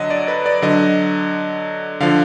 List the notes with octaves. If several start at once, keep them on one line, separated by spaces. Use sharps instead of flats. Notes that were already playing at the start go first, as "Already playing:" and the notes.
Already playing: D3 F#3 D#5 F#5
D5
B4
D5
D3 F#3 D#5
D3 F3 F5